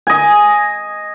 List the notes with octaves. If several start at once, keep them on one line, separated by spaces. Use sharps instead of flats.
D#5 G#5